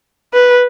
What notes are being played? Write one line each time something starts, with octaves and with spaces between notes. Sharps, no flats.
B4